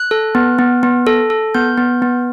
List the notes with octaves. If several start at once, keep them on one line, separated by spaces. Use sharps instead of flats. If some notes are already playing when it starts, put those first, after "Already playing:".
Already playing: F#6
A4
B3
B3
B3
A4
A4
B3 G6
B3
B3